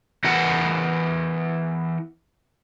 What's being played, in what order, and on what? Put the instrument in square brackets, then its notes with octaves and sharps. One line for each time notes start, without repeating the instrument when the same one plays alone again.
[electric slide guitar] E3 B3 A#4 F#5